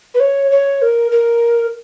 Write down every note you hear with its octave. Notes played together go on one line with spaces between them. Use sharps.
B4
C#5
C#5
A#4
A#4